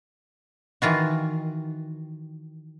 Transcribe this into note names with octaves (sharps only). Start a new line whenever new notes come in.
D#3 E3 F4 F#4